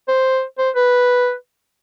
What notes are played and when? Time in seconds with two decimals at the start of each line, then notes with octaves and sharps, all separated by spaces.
0.08 C5
0.58 C5
0.76 B4